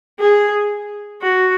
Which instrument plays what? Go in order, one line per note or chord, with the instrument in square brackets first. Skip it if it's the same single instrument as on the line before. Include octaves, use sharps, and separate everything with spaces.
[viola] G#4
F#4